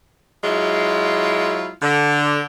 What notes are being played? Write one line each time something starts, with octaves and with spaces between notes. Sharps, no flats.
F#3 G#3 E4 F4
D3